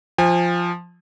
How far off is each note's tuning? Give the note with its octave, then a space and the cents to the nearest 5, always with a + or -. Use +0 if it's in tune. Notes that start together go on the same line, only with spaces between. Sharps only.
F3 +0 G#5 -40